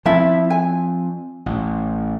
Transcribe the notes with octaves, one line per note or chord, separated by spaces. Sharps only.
F3 C4 E4 E5 A5
G#5
A1